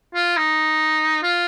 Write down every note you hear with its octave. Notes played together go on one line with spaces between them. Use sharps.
F4
D#4
F4